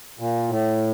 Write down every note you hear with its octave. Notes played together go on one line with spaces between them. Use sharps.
A#2
A2